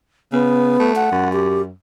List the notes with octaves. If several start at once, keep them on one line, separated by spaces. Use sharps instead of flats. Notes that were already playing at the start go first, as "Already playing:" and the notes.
C#3 B3
A3
F#5
F#2
G4